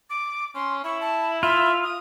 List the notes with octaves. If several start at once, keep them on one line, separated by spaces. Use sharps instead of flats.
D6
C#4 C6
E4 C#6
A5
F4 E5
D#6